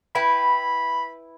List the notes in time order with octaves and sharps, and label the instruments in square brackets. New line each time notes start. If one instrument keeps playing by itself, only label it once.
[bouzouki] E4 B4 G5 [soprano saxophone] B5